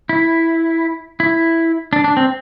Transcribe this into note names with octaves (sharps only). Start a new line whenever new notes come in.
E4
E4
D4
D4
C4